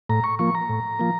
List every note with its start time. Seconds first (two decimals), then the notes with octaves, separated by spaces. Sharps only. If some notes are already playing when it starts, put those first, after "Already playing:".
0.09 A2 A#5
0.24 C#6
0.39 F3 A#3 C#6
0.55 A#5
0.69 A2
0.99 F3 A#3